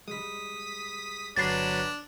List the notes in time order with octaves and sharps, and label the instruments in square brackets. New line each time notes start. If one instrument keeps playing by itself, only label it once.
[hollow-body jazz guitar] G3 G#3 [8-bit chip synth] D#6 B6
[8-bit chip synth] G1 F#3 B4 [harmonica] D4 [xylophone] A6 C7